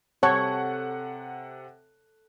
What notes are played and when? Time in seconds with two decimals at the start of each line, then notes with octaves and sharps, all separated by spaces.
0.23 C3 A4 C#5 F#5 F#6